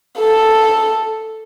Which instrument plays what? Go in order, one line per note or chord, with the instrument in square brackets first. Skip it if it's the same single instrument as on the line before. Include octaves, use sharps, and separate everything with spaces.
[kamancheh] A4